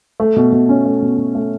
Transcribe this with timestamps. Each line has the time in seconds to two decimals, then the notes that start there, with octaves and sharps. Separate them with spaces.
0.20 A3
0.36 B2
0.52 B2
0.69 C#4
0.86 A3
1.02 B2
1.18 B2
1.35 A3